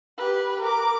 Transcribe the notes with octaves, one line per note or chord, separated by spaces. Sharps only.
G4 B4
A#4 D6